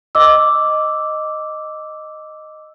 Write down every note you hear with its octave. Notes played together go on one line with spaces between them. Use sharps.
D#5 D6 E6